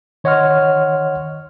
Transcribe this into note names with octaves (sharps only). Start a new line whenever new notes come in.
D#3 C#5 D#5 F#5 C6 F6